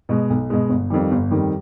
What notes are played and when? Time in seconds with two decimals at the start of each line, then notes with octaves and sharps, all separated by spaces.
0.09 B2 G#3
0.30 B1
0.50 B2 G#3
0.69 G1
0.90 F2 D#3 G3
1.11 G1
1.30 F2 D#3 G3